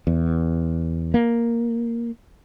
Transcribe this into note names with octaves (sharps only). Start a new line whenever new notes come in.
E2
A#3